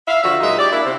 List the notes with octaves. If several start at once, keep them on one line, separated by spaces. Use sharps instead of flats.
E5 F5
D3 F3 F#4 E5
A#2 F#3 G#3 D#4 E5
G4 D5
A#3 D4 E4
C3